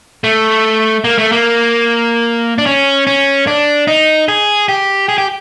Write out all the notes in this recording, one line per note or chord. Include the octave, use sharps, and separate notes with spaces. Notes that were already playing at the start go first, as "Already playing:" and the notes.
A3
A#3
A3
A#3
D4
C#4
C#4
D4
D#4
G#4
G4
G#4
G4